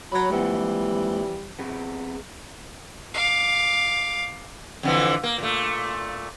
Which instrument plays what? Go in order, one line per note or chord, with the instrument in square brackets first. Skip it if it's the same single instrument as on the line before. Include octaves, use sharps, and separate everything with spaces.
[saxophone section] F#3 [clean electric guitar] B5
[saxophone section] F2 E3 G3 [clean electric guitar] G#3 A#3 F#5
[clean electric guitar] B3 C4 G#4
[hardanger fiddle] F5 D6
[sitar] F2 D3 E3
A#3
A#2 A3